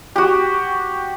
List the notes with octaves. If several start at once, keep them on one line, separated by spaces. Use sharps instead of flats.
F#4 G4